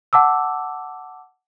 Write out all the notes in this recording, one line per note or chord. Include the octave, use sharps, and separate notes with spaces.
F#5 A5 D6 E6